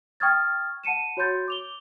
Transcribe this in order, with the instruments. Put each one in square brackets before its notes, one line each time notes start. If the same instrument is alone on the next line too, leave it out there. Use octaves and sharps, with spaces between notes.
[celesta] G5 C#6 D#6 F6 G#6 A6
F#5 A5 C#7 D#7 E7
F#4 C#5 B5 C6 G6 A6
D6 F7 G7